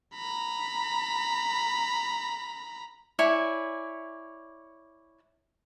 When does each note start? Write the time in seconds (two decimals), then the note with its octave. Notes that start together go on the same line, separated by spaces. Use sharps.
0.14 A#5 B5
3.19 E4 C#5 D5 G#5